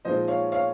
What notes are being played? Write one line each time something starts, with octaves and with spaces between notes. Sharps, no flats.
A#2 F3 G#3 D#4 C5 D#5
C#5 F5
C#5 F5